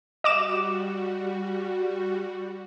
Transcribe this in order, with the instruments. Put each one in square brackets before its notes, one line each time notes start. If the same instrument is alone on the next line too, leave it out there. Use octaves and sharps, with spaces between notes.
[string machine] G3 F#4 [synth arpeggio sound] D#5 D6 E7